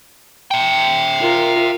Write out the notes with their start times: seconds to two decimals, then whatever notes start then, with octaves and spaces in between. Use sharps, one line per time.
0.51 E5 G5
1.20 F4 A#4